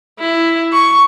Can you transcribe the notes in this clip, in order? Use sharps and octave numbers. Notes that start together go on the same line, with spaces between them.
E4
C#6